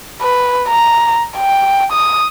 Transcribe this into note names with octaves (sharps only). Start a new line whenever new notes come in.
B4
A#5
G5
D#6